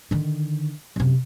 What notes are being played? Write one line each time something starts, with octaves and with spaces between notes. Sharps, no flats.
D3 D#3
F#2 C3